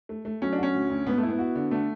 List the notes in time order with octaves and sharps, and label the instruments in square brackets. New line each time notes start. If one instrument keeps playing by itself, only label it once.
[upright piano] A3
A3
[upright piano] F#3 [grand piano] C#4
[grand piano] D4
[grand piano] C#4 [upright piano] F#4
[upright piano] D2
D2
[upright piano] G#2 [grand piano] B3
[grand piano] A3
[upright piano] E4
[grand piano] B3
[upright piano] F#4
D3
[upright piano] D3 [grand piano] A3